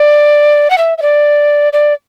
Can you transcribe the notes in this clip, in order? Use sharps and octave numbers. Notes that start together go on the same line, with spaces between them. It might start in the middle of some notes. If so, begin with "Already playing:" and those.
Already playing: D5
F#5
E5
E5
D5
D5